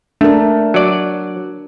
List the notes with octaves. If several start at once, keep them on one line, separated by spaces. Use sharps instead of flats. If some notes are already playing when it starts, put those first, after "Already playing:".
A3 D4 A#4
F#3 D5